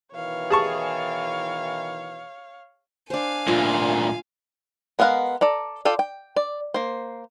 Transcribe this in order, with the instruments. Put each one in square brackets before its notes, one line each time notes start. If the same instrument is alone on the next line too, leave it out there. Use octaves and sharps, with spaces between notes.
[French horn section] B2 D#3 E3 [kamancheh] C#5 F5
[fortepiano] G#4 A5 C#6
[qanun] D4 C5 [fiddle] F5 G#5
[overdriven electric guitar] D2 A#2 [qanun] F4
[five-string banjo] G#3 B3 A#4 F5 F#5
A4 D5 A#5
F4 A4 D5 G5
G5
D5
A#3 C5